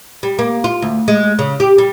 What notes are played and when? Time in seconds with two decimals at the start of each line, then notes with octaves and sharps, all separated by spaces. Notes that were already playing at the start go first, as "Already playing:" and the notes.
0.23 G3
0.39 A#3
0.64 F4
0.82 D2
1.08 G#3
1.39 C#3
1.60 G4
1.78 G3